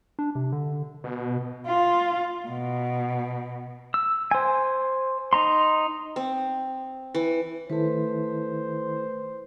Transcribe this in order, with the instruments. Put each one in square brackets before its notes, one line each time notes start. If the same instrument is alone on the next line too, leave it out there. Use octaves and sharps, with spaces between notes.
[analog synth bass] D4
C3
D3
[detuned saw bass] B2
[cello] F4
B2
[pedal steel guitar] E6
C5 G#5
D#4 A#5 C6
[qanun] C4
E3
[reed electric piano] D#3 E4 A4 [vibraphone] A3 B4 [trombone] C5